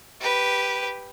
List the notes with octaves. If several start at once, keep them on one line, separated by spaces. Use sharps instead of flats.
G4 B4